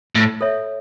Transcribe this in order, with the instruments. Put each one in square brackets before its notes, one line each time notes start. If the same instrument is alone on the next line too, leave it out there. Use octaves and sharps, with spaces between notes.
[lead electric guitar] A2
[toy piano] A4 C#5 E5